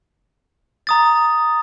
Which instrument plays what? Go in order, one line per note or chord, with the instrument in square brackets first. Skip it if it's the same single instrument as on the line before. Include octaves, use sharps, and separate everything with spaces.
[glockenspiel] A#5 D#6 A6